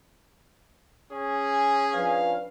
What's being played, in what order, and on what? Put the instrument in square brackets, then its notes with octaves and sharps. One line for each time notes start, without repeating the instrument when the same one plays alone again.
[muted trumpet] C#4 [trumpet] G#4
[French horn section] F3 D4 B4 [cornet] F5